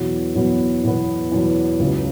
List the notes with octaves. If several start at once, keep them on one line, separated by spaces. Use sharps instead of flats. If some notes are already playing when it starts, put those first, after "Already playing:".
Already playing: E2 B2 F#3 B3
E2 B2 F#3 B3
E2 B2 F#3 B3
E2 B2 F#3 B3
C#2 C#3 F#3